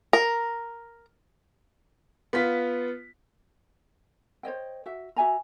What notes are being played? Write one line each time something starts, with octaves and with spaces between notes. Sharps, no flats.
A#4
B3 F4 B6
C5 C#5 D#5 G5
F#4 E5
F#4 E5 G#5 A#5